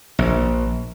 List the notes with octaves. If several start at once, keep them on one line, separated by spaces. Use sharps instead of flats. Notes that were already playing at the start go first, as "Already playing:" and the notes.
A#1